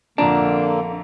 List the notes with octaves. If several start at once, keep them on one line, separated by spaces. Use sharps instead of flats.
A#1 F2 D3 A#3 D4 A#5